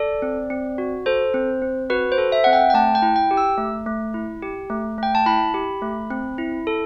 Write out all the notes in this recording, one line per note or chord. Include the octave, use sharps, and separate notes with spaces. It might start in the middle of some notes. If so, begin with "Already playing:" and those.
Already playing: A4 D5
C4
C4
F#4
A4 C5
C4
C4
F#4 B4
C5
A4
E5
C4 F#5
G5
G5
A3 A5
G5
E4
G5
G4
E6
A3
A3
E4
G4
A3
A3 G5
A5
E4 B5
G4
A3
C4
E4
A4